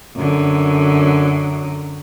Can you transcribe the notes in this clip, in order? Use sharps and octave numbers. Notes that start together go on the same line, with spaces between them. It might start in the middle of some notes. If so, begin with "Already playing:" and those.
F#2 D3